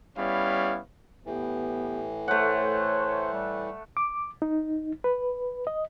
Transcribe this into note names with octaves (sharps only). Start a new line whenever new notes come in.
G3 B3 C#4 E4 C#5 F5
A2 E3 B3 G4
A3 C5 C#5 F#5
G3
D6
D#4
B4
D#5